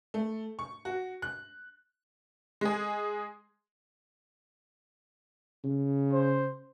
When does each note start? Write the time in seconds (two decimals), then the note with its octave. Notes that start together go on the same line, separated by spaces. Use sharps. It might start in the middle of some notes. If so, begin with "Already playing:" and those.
0.14 A3
0.59 C#6
0.85 F#4
1.22 F#6
2.61 G#3 G#4
5.64 C#3
6.12 C5